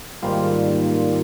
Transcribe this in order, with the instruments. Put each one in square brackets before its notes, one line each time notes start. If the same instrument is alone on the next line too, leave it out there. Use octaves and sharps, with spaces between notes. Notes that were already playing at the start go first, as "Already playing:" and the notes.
[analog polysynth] G#2 D#3 G3 A#3 F4